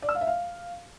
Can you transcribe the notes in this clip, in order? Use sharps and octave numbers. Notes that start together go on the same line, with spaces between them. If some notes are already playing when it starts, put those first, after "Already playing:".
D5
E6
F5
E5
F5